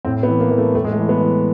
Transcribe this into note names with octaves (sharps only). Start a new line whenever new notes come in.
A2 C4
B3
E3
A#3
E3 A#3
A3
A2 A3
G#3
A3
E3
B3
E3